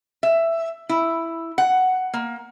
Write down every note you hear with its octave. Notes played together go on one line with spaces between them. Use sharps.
E5
E4
F#5
A#3